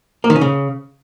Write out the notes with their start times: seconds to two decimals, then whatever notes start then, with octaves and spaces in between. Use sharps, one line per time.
0.24 A#3
0.30 D#3
0.36 C#4
0.41 C#3